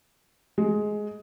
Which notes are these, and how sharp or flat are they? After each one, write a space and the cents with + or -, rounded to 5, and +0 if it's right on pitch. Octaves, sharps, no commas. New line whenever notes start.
G#3 +10